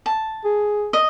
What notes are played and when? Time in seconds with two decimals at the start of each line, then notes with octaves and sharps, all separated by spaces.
0.06 A5
0.45 G#4
0.93 D#5